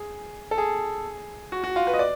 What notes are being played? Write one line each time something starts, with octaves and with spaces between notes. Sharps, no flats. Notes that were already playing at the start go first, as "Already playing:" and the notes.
Already playing: G#4
A4
G#4
F#4
F#4
F4
B4
D#5
D5